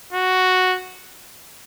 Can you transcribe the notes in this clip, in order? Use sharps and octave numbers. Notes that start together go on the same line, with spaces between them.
F#4